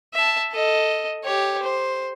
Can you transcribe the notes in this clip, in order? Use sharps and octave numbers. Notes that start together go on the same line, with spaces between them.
E5 A5
A4 D#5
G4 C#5
C5